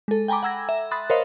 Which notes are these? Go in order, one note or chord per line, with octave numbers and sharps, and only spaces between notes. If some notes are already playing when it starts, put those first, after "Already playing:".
G#3 A4
G5 G#5 A#5 B5 D6
F#5 A#5 E6 G#6 A#6
E5
B5 C6 D#6 F#6 A6
A#4 C5 C#5 D#5 F5 B5